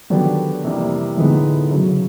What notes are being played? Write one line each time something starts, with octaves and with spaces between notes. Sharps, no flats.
D3 D#3 F#3 B3 D4 G4
F2 C3 E3 G3 A#3
A2 D3 F3 G#3 B3 D#4
F#2 C#3 F#3